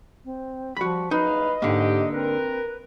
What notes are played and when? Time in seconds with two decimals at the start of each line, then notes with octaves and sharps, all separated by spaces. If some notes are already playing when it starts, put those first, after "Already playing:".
0.25 C4
0.77 F3 G3 F#4 B5
1.11 F#1 D#4 B4 D#5 F5
1.62 G#2 D3 A#3 G4
2.13 C4 A#4 B4